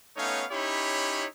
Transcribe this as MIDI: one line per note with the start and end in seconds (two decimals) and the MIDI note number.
0.17 0.44 57
0.17 0.44 59
0.17 0.44 61
0.17 0.44 63
0.17 0.44 73
0.17 0.44 77
0.52 1.25 61
0.52 1.25 63
0.52 1.25 64
0.52 1.25 67
0.52 1.25 73
0.52 1.25 83